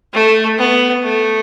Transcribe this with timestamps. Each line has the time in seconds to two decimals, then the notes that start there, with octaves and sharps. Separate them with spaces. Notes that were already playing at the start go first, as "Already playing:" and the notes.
0.14 A3
0.59 B3
1.04 A3